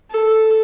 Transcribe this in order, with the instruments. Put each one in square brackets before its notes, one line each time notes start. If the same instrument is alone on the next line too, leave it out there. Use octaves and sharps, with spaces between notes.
[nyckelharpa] A4